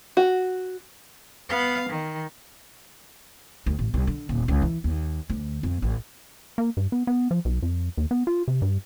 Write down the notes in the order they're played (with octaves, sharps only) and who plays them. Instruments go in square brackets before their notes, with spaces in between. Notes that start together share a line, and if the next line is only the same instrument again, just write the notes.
[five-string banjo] F#4
[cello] B3 F5
D#3
[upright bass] D2
A1
C2
D3
D#1
C#2
E3
D#2
D2
F2
A1
[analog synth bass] A#3
G2
B3
B3
F3
B1
F2
D#2
B3
F4
C3
G2